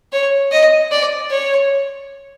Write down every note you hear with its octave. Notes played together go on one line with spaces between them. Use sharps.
C#5
D#5
D5
C#5